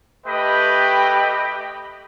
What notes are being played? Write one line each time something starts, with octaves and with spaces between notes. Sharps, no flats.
A3 G4 B4 D#5 G5 B5